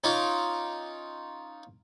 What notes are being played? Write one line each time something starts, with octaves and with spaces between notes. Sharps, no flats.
C#4 D#4 F4 D6